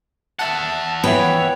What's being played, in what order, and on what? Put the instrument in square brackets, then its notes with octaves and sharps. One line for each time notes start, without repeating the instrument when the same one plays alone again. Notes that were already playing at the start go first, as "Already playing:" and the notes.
[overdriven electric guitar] E5 F#5 [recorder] A5
[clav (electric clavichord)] E3 B3 [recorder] C#5 [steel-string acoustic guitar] G5